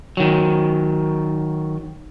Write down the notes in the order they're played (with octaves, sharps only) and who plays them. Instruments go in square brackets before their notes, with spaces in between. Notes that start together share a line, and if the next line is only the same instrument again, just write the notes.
[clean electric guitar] D#3 F#3